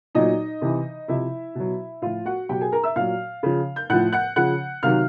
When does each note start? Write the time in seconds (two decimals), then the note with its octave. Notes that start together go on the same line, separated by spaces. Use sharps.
0.15 A#2 F#3 D#4 D#5
0.62 C3 E3
1.08 C3 F3 E4 E5
1.55 B2 F#3
2.02 A2 F3 F4 F5
2.25 F#4 F#5
2.49 B2 F#3 G4 G5
2.61 G#4 G#5
2.72 A#4 A#5
2.84 E5 E6
2.96 A#2 F#3 F5 F6
3.43 C#3 F3
3.76 G6
3.90 A2 F3 F#5 F#6
4.13 F#5 F#6
4.36 C#3 F3 F#5 F#6
4.83 C3 D#3 F#3 F5 F6